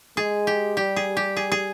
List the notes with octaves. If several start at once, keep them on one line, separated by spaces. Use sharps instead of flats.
G#3 G#4
G4
G3 G4
G#4
G4
G#4
G#4